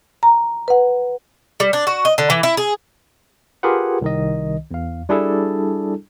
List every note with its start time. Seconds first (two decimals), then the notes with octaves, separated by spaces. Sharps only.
0.23 A#5
0.68 B4 F#5
1.60 G3
1.73 D4
1.87 F#4
2.05 D#5
2.18 D3
2.30 E3
2.43 E4
2.57 G#4
3.63 F4 G4 G#4 A#4 B4 F#5
4.02 C2 D#3 D#5
4.71 E2 F5
5.09 G3 D4 E4 G#4 A4